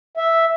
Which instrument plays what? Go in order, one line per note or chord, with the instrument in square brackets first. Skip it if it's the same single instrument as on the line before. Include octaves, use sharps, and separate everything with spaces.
[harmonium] E5